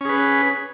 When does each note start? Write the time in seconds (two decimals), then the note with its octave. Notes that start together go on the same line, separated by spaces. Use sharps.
0.01 C#4
0.05 G#4
0.09 B4